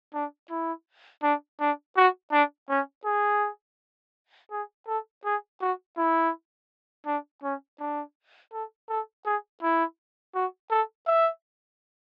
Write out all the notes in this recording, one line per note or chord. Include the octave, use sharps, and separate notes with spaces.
D4
E4
D4
D4
F#4
D4
C#4
G#4
G#4
A4
G#4
F#4
E4
D4
C#4
D4
A4
A4
G#4
E4
F#4
A4
E5